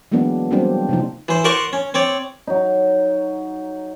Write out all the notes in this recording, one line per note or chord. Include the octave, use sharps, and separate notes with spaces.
E3 F#3 G#3 A#3 B3 D4
F#3 G3 A#3 C4 D4
C3 F3 D#4
E3 C5
A#4 C5 D5 F#5 C6 C#6
C#4
C4 C#5 D5
F#3 D#4